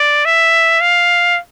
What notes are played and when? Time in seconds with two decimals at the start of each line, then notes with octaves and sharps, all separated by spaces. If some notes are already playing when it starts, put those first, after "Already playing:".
Already playing: D5
0.26 E5
0.81 F5